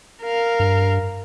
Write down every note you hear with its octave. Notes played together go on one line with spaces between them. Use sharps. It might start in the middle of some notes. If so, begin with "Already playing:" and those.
A#4 F5
G2